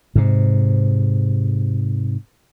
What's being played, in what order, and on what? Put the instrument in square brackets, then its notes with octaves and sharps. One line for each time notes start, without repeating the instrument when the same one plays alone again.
[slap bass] G#2 C3